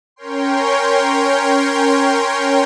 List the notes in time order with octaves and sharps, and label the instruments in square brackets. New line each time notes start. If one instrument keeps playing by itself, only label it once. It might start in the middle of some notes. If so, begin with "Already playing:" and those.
[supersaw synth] C#4 A#4 C#5 G5 C6